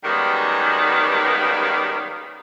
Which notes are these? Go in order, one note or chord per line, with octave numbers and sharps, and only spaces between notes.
F#2 D#3 G3 G#3 A#3 B3